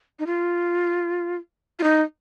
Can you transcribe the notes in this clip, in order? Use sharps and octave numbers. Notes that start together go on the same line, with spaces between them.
D#4
F4
F4
D#4